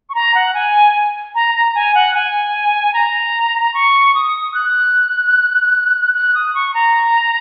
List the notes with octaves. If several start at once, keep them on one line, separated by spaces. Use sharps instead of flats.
C#6
A#5
F#5
G#5
A#5
A#5
G#5
F#5
G#5
A#5
C#6
D#6
F#6
F#6
D#6
C#6
A#5